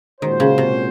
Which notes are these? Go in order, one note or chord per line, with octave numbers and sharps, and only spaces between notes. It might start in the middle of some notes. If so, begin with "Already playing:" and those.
A#2 D#3 G#3 C#4 F#4 C5
C#3
C3